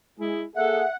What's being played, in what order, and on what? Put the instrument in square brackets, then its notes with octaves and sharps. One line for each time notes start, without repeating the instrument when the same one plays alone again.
[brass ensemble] G#3 G#4 [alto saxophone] E4
[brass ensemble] A#3 G#4 [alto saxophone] A4 [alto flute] E5 [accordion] F#5